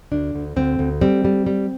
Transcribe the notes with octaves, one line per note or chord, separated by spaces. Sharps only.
D2 D4
D2
D2 C4
D2
G3 C4
G3
G3